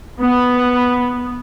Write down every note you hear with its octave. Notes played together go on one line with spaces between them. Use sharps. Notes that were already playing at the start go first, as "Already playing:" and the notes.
B3